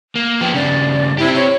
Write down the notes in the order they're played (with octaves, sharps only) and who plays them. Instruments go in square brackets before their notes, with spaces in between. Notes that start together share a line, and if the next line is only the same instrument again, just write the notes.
[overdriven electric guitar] A#3
[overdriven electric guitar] F3 B3 [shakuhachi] G5
[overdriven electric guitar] G2 C#3 [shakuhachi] D5
[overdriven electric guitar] C4 G4 [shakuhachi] E4
[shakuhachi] C#5